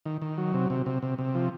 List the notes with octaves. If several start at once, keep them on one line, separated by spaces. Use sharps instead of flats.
D#3
D#3
F#3
C3
C3
C3
C3
C3
F3